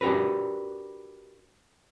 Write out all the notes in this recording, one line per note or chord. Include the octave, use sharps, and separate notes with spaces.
D4 F#4 G4 A#4 B4